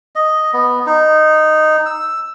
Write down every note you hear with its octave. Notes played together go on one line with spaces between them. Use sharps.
D#5
B3
D#4
E6